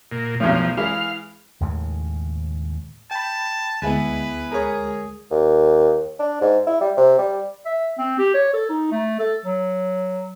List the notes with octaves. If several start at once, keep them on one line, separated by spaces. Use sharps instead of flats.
A#2
B1 E2 A2 F3
E3 G#3 E4 F5
D#2 A2 C#3 G#3
G5 A5 B5
D2 G#3 B3 E4 B4 G#5
G#4 A#4 C#5
D#2
D4
G#2
E4
G3
C3
G3
E5
C4
G4
C#5
A4
D#4
A3
A4
F#3